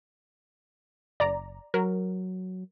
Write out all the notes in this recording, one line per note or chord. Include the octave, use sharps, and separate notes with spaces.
F#1 D5 A#5
F#3 A#4